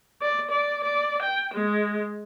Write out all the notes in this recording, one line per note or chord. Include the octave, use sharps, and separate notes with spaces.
D5
D5
D5
G5
G#3